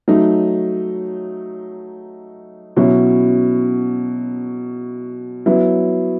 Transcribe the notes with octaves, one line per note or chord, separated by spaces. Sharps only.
F#3 A3 D#4
B2 F#3 C#4 E4
F#3 B3 E4